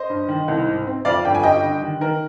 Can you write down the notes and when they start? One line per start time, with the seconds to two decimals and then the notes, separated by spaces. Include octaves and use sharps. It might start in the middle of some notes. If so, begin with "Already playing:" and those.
Already playing: C5 D#5
0.10 G2
0.29 D#3
0.48 C2
0.67 G#2
0.87 C4
1.05 F2 D5 F5
1.25 G1 G5
1.35 G#5
1.43 G3 D#5 G5
1.63 D3
1.82 D#3
2.01 D#3 A#4